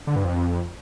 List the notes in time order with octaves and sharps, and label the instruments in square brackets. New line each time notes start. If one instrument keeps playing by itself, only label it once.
[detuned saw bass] D3
G2
F2